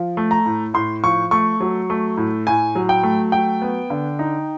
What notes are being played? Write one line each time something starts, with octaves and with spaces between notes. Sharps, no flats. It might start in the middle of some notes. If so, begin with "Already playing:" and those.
Already playing: F3
A3
A#5
A2
A2 C6
F3 C#6
A3 C#6
F#3
A3
A2
A2 G#5
F#3
G5
A3
F#3 G5
B3
D3
D#4